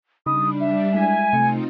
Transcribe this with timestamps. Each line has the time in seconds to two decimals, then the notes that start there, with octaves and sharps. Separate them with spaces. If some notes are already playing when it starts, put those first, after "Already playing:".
0.26 C#3 G3 D4 D#4 B5 D#6
0.60 E5
0.95 G#3 E4 G#5 B6
1.33 C3 A3 C4 D#4 F4 C#7